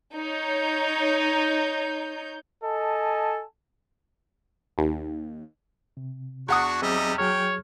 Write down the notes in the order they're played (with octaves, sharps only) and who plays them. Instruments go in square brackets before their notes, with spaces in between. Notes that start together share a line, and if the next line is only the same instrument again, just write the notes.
[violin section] D#4 C#5 G6
[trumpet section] A4 D#5 G#5 A5
[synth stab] D#2
[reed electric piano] C3
[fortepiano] E2 F#5 D#6 [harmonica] D4 F#4 C#6
[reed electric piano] F#3 C4 G#4 [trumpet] G3 [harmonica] D#4 D#5 E5
[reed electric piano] F#3 G#4 F6 [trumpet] C#5 [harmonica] G5